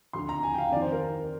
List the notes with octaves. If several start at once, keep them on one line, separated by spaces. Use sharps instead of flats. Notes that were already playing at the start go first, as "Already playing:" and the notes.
D2 D3 C6
A#5
G#5
G5
F5
F2 D#3 D5
C5
A#4